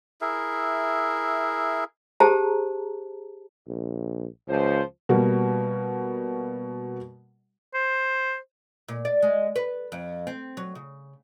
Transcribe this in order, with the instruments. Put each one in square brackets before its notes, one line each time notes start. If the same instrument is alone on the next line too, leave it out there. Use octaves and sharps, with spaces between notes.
[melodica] E4 G#4 A#4 E5
[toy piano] G4 G#4 C5 A5 A#5
[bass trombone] A#1
[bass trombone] C#2 [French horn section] F3 C5
[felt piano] B2 G3 A#3 F#4
[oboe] C5
[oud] A#2
D5
G#3
B4
F2
C4
F#3
C#3